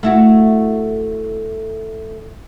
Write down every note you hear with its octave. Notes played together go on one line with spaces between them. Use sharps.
A3 E4 F#4